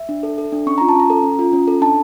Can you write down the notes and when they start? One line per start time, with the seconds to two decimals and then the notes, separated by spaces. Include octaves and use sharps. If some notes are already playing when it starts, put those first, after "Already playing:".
Already playing: E5
0.09 D4
0.23 A4
0.38 A4
0.52 D4
0.67 C#4 C#6
0.78 F4 A#5
0.89 A5
0.95 C#4 A#5
1.10 A4
1.24 C#4
1.39 F4
1.53 C#4
1.68 A4
1.82 D4 A5